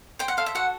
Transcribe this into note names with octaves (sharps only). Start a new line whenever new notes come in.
C5 G5
F#5
A4 F5
E5
F#4 F#5